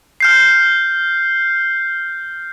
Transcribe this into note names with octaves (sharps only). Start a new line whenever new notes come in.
F6 G6 C7